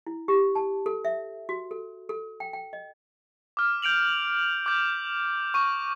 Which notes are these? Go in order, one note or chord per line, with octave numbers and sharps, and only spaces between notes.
E4
G4
A5
A4
E5
F#4
A4
A4
G5
G5
D#5
D6 F6
G6 D7 F7 F#7
D6 G6
C#6 D#7